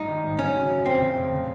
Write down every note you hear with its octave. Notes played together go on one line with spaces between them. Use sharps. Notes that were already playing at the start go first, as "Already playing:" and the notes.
Already playing: A1 G2 D#4
D#3
G#1
C#3 C#4
F#3
F#2
F2 C4
C#3
F1
C#3